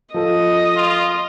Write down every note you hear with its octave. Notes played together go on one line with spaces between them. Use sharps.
F3 A4 D#5
F4